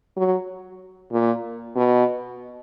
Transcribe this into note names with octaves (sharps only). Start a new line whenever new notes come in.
F#3
A#2
B2